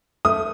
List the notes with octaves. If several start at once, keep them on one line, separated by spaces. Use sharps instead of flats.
A3 D#6